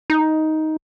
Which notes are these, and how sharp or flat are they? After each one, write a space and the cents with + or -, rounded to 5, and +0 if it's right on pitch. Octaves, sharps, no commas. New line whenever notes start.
D#4 +10